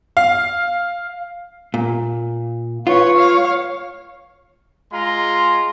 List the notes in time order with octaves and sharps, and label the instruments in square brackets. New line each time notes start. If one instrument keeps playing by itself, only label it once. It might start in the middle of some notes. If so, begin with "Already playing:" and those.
[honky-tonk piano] F5
[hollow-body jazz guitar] A#2
[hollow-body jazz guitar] F4 [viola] B4 C#5
[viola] C#5 F5
[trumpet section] G#3 F4 A#5 C6